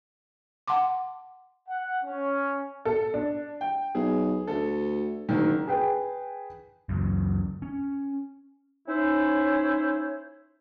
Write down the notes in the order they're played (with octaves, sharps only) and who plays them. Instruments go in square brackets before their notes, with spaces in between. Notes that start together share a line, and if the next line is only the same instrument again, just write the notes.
[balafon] F#5 A5 C6 D6
[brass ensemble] F#5
C#4
[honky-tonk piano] A4
D4
[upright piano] G5
[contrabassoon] B1 [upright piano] G#4
[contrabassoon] D2 [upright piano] A4
[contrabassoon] F#1 [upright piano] D3 D#3
[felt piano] G#4 B4 G5
[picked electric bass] C#2 F#2
C#4
[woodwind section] C#4 D#4 E4 C5 C#5